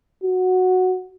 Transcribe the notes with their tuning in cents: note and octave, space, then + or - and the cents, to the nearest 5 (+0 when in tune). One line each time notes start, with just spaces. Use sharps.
F#4 -5